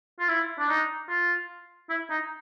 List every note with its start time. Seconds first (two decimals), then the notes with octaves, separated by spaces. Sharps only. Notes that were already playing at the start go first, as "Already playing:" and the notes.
0.20 F4
0.29 E4
0.59 D4
0.69 D#4
1.09 F4
1.90 E4
2.10 D#4